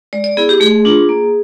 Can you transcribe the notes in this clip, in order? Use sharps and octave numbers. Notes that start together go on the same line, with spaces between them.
G#3 D5
D5
B3 E4 G#4
G4
A3 G#4
D4 F4
A#3